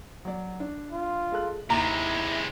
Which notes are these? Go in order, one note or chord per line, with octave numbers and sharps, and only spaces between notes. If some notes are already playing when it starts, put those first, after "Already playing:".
F#3 D5
D4
F4
G#3 A4 F#6
D#2 C3 G#3 E4 A#5